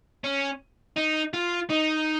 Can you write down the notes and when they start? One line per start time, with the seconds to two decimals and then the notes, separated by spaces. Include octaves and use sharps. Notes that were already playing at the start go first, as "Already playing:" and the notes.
0.24 C#4
0.97 D#4
1.34 F4
1.70 D#4